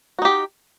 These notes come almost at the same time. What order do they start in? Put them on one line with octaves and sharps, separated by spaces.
F#4 D#4 G4